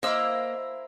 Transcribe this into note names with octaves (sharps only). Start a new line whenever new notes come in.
A#3 E4 A#4 C5 D#5 F5 E6